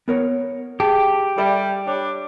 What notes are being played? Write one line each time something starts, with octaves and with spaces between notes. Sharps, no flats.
B3 A#4 C#5
G4 G#4 A5
G3 A4 D5 E5
D4 C#5